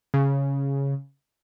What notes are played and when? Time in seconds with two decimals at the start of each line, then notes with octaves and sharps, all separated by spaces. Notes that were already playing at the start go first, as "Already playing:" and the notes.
0.14 C#3